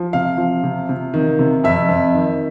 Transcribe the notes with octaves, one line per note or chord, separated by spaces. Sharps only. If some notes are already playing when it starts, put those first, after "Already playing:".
Already playing: F3
C3 F5
F3
C3
C3
D#3
C3
F2 E5
F2
D#3